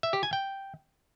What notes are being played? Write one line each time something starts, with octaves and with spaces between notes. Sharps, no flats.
E5
G4
G#5
G5